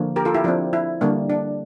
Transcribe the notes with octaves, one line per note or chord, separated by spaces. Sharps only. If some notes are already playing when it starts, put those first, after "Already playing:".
Already playing: D3 F3 A#3
G4 A#4
F4 A4
E4 G4
F3 C4 D4 F4
E4
D3 G3 A#3 D4
D4